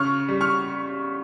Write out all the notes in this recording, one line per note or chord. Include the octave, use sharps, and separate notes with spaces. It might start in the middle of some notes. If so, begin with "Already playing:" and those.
Already playing: C#3 C#6 F6
G3
C#6 F6